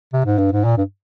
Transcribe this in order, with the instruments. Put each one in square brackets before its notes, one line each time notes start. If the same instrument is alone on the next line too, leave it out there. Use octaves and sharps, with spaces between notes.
[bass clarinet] C3
G#2
G2
G#2
A#2
G2